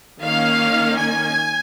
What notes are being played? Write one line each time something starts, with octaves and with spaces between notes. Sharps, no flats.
D#3 A#3 C#4 F5
G#5